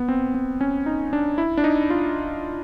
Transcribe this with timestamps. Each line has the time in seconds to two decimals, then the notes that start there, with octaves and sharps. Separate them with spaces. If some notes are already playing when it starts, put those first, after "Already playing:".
Already playing: B3
0.08 C4
0.34 C4
0.61 C#4
0.86 D#4
1.13 D4
1.38 E4
1.57 D4
1.64 D#4
1.90 F4